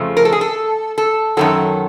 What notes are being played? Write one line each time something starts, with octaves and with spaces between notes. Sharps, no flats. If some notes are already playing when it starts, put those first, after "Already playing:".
Already playing: F2 C#3 F3 A3
A#4
A4
G#4
A4
A4
F#2 D#3 F#3 A4